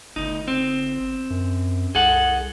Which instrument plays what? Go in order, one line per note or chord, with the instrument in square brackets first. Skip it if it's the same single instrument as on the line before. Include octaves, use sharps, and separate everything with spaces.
[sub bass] G1 [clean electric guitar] D2 D#4
[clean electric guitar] C4
[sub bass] F#2
[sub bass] C2 [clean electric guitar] G#4 A4 F#5